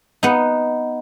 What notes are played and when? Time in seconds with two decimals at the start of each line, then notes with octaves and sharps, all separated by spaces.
0.23 B3 D#4